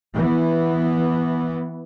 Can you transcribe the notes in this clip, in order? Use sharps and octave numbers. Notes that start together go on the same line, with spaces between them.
E3 B3